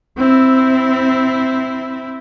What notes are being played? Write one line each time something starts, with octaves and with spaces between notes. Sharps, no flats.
C4 E4